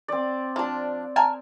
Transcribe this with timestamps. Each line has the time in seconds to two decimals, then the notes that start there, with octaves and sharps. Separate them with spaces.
0.08 C4 D5
0.56 F3 D4
1.16 A#4 G#5 A5